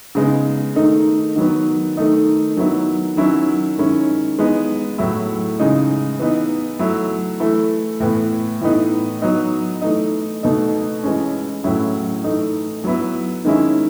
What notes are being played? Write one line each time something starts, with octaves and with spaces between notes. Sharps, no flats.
C#3 G#3 B3 D#4
D#3 A3 D#4
D#3 F#3 B3
D#3 A3 D#4
D#3 F#3 B3 E4
D#3 F#3 C#4 E4
D#3 G#3 C#4 E4
E3 G#3 B3 D#4
A2 F#3 A3 E4
C#3 E3 G#3 D#4
E3 B3 D#4
F#3 A3 E4
E3 A3 E4
A2 E3 B3
A2 E3 B3 D#4
F#3 B3 D#4
E3 A3 D#4
B2 A3 D#4
E3 G#3 C#4
A2 F#3 C#4 E4
E3 A3 D#4
F#3 B3 E4
D#3 G#3 C#4 E4